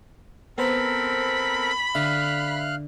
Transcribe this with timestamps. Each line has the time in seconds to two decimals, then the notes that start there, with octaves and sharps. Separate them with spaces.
0.58 B3 C4 A4 A#4 C5 A#5 B5
1.95 D3 E5 F5 F6 F#6